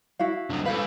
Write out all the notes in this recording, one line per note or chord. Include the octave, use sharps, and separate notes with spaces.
E4 F#4 F5
D3 F#3
F4 A4 B4 C5 F5